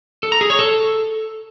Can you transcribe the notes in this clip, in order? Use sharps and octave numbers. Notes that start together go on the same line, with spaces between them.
A4
A#5
G#4
C#5
A4